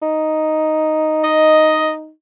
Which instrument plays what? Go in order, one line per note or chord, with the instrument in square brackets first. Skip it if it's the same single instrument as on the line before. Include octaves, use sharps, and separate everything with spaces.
[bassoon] D#4
[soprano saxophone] D#5